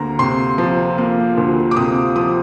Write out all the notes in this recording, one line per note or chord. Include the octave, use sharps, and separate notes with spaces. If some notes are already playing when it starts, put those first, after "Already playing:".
Already playing: D2 A#3 A#5
C3 C6
F3
A#3
D2
D6
C3 D#6
F3 D#6